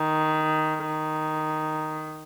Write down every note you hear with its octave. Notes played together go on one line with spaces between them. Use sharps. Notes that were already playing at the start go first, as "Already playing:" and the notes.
Already playing: D#3
D#3